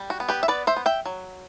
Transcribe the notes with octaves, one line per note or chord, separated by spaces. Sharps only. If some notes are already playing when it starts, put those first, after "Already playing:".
Already playing: G3
F#4
B3
G4 B4
E5
B3 B4 D5
C5 E5
B3
E5 G5
F#3